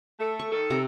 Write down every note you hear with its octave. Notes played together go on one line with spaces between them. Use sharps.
A3 A4
C#6
D#3 A4
C3 A#5 D6